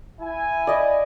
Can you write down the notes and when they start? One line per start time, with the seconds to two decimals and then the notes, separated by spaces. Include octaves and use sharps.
0.20 E4 G#5
0.67 D5 D#5 B5